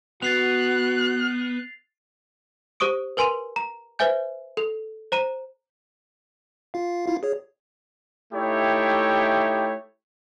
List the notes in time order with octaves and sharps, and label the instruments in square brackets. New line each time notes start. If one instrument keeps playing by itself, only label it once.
[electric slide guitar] B3 [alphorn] F#4 [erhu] F#6 [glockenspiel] A6 C7 F7
[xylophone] G4 C5 C#6 D#6 D7
A#4 B4 G#5 C6 D#7 F7
A#5
B4 C5 E5 G#5 G6
A4 F7
C5 A#5 D#7
[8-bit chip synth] F4 F5
E4 F4 F5
G#4 C#5
[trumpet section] A3 D#4 E4 G4 C#5 G5